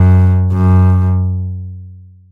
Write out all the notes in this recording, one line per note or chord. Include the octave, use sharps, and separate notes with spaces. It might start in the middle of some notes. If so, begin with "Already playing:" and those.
Already playing: F#2
F#2